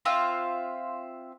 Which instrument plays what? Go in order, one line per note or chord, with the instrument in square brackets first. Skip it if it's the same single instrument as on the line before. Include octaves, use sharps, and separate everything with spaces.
[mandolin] C4 F4 E5 F5